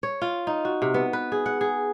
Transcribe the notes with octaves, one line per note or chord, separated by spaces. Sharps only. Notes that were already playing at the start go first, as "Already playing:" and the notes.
C#5
F4
D#4
F#4
C3
B3
B4
G#4
F#5
G#4